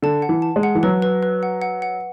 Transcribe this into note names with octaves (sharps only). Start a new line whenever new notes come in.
D3 A5
F#5
E3
A5
G#3
F#5
E3
F#3 B4
B4
B4
F#5
F#5
F#5